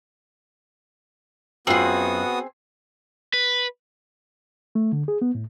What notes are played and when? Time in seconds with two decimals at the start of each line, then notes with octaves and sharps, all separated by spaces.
1.67 F#2 B3 C4 F4 F#4 G#4 D#6
3.33 B4
4.75 A3
4.92 D3
5.08 G#4
5.22 B3
5.35 A2